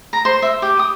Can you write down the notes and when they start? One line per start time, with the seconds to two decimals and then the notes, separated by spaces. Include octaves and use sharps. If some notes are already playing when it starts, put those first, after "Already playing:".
0.13 A#5
0.25 C5
0.42 E5
0.62 G4
0.79 D#6